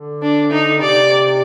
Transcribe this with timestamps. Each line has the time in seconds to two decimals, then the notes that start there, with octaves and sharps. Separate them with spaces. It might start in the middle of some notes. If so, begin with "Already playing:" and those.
Already playing: D3
0.22 D4
0.52 D#4
0.81 C3 D5